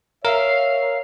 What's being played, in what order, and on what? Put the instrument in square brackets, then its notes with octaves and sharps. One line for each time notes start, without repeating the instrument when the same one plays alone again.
[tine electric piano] A#4 [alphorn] C#5 [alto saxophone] E5 [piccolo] F5